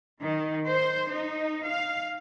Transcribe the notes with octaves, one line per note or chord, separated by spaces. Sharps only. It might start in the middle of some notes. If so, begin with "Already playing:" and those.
D#3
C5
D#4
F5